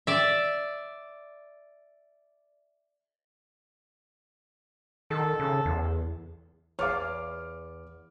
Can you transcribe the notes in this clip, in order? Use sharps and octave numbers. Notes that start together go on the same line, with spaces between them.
D5 E5
D#3 A4
C#3
E2
E2 C#5 F5 D6 F6